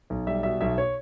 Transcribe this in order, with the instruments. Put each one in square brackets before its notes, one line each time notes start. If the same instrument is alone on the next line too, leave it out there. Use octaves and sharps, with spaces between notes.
[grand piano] B1
G3 E5
B2 E5
B1 E5
C#5